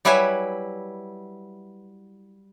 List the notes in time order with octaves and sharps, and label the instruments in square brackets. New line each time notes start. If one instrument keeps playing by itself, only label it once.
[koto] F#3 G3 E4 B4 E5 G#5